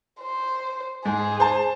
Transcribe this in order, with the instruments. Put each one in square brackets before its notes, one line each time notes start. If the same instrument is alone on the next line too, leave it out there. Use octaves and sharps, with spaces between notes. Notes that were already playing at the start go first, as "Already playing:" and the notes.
[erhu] C5
[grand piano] G#2 [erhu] G#4
[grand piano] C5 A5